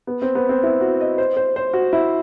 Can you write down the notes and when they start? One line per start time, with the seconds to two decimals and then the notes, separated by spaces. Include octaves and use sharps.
0.07 B3
0.22 C4
0.35 B3
0.49 C4
0.63 E4
0.81 F#4
1.01 D#5
1.18 C5
1.37 C5
1.56 C5
1.73 F#4
1.93 E4